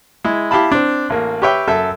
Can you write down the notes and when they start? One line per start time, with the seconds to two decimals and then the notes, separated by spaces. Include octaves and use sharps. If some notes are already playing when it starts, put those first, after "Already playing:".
0.24 G#3 E4
0.51 E4 G4 F5 A5 B5
0.72 C4 D4
1.10 A1 A#3
1.42 G4 B4 C#5 E5 G5
1.68 F#2 A4 E5